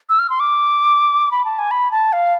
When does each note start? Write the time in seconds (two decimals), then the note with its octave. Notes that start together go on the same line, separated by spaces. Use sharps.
0.09 E6
0.19 F6
0.30 C6
0.40 D6
1.31 B5
1.45 A5
1.58 G#5
1.71 B5
1.91 A5
2.13 F5